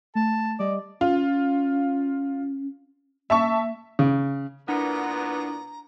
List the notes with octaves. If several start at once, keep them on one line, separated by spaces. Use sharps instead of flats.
A3 A5
G3 G4 D5 D#5
C#4 F4
A#3 E5 A5 C#6
C#3
A#2 B3 D4 E4 F#5 A#5